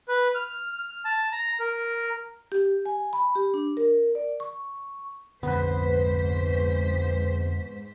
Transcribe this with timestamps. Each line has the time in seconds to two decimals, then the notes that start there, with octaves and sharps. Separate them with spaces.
0.08 B4
0.35 F6
0.79 F6
1.05 A5
1.32 A#5
1.60 A#4
2.52 G4
2.86 G#5
3.13 B5
3.35 G4
3.54 D4
3.77 A#4
4.15 D5
4.40 C#6
5.43 F2 G#2 D3 B3 B4 C5 B6